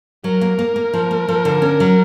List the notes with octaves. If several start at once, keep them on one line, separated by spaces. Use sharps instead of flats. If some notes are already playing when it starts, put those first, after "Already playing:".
F#3 A#4
A#3
A#3
A#3
F3
A#3
F3
D3
C#4
F#3